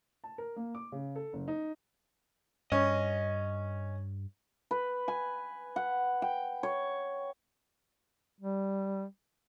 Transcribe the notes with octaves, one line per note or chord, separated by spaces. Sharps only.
A5
A#4
A#3
D6
C#3
A4
F#1
D#4
G2 C#4 D#5
B4
G#5
F#5
G5
C#5
G3